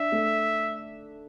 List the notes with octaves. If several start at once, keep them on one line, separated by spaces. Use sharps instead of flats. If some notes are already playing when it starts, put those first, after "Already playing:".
Already playing: D4 E5
A3